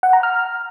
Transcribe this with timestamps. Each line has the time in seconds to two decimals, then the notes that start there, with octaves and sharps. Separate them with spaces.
0.03 F#5
0.13 A#5
0.23 F6